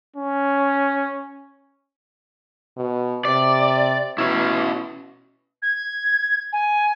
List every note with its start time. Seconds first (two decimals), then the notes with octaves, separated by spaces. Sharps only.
0.17 C#4
2.77 B2
3.25 C3 D5
4.18 B2 C#4 E4
5.62 G#6
6.52 G#5